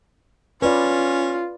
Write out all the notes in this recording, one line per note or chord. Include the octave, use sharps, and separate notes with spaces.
C#4 F4 B4 D5